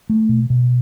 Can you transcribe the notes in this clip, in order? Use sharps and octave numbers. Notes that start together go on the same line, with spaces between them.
A3
B2
B2